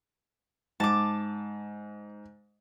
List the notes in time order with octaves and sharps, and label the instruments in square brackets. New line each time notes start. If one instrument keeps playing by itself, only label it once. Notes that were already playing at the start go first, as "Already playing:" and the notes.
[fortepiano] G#2 [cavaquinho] A5 D6